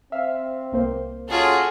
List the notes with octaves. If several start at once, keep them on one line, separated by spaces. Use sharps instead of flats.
C4 E5 F5
C2 A#3 C5
C#3 F4 F#4 G#4 A4